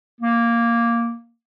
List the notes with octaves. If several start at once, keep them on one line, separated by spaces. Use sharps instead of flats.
A#3